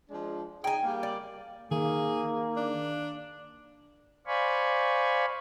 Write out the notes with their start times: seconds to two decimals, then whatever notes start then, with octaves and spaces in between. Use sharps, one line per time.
0.10 F3 G#3 D4
0.64 D#4 G#4 G5 G#5
0.82 G3 A#3
1.03 D5
1.71 D#3 A#3 G#4
2.56 D4
4.27 C5 D5 F5 G#5 B5 C#6